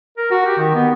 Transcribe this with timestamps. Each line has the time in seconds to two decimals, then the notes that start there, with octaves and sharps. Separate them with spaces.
0.17 A#4
0.31 F#4
0.46 G4
0.58 D#3
0.75 B3